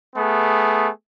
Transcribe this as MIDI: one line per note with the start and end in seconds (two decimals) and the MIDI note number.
0.16 0.89 57
0.16 0.89 59
0.16 0.89 68